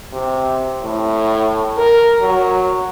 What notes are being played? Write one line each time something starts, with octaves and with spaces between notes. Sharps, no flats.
C3
A2
A#4
F#3